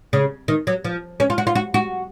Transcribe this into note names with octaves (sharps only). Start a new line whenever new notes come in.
C#3
D#3
F#3
F3
C#4
F4
F#4
F4
F#4
F#4